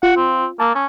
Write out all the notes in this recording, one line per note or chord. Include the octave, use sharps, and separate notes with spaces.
F4 F#5
C4
A#3 A5 E6
C#4